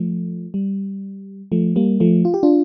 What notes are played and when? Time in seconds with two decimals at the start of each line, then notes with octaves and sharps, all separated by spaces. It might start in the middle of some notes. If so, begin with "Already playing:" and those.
Already playing: F3 A3
0.54 G3
1.52 F3 A3
1.76 G3 A#3
2.00 F3 A3
2.25 F4
2.34 G4
2.43 D4 F4